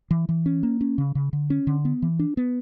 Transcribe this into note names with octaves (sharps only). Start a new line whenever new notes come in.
E3
E3
C#4
A#3
C#4
C#3
C#3
D3
C#4
D3
B3
E3
D4
B3